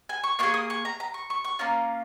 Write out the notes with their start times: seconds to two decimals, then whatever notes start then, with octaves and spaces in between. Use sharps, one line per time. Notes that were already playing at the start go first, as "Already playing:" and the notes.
0.09 G#5
0.24 C#6
0.39 A#3 F4 G#4 C#6
0.54 D#6
0.70 C#6
0.85 A#5
1.00 A#5
1.14 C#6
1.30 C#6
1.44 C#6
1.59 A#3 C#4 F4 A#5